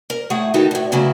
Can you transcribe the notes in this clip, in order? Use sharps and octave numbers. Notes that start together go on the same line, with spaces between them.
A#4
A2 A3 G#4 F#5
D#3 E3 D#4 F#4 G4 A4
D2 A2
A2 C#3 E3 F#3 A3 E4